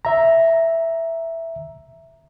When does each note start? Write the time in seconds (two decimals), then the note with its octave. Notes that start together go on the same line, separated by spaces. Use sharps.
0.05 E5 A#5